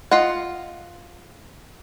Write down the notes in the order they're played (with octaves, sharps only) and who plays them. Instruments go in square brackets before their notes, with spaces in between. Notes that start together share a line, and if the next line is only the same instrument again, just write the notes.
[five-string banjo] F4 D#5 F#5